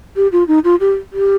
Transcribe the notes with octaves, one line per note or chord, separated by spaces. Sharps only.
G4
F4
D#4
F4
G4
G4